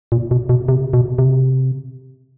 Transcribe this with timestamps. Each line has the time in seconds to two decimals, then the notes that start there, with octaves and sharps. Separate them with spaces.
0.12 A#2
0.31 B2
0.49 B2
0.69 C3
0.93 B2
1.18 C3